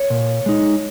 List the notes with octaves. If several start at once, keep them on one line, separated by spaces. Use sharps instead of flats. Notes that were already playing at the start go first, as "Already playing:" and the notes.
Already playing: C#5
A#2
G#3 D#4